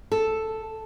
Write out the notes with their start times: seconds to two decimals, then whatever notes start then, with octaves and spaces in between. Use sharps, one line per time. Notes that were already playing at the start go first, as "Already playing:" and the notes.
0.12 A4